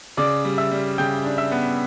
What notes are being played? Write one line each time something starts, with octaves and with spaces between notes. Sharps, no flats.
C#3 D5 D6
G3
E5 E6
G3
C#3 G5 G6
D4
E5 E6
B3